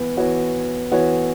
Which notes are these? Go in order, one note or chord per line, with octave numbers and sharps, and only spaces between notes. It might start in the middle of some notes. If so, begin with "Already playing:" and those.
Already playing: E3 B3
E3 B3 F#4 C#5
E3 B3 F#4 C#5